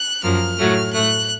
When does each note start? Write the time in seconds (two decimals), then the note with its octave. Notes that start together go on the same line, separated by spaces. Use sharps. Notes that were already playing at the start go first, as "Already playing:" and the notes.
Already playing: F#6
0.23 F#2 F3 A#3 F6
0.58 A2 F#3 A3
0.93 A2 A3 F#6